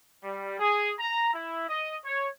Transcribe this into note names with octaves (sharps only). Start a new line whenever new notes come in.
G3
G#4
A#5
E4
D#5
C#5